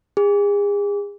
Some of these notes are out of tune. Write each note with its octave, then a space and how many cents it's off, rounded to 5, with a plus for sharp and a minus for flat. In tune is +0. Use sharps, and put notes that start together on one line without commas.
G#4 -35